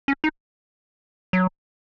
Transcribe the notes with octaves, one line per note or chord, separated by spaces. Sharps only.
C#4
D#4
F#3